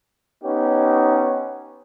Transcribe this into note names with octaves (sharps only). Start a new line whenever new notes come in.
B3 C#4 D#4 G4